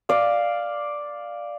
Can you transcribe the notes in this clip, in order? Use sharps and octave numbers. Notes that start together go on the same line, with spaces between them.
D5 F5